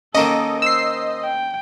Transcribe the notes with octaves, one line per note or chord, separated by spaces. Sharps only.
D#3 A#3 C#4 A4 D#5
C5 E6 C7
G5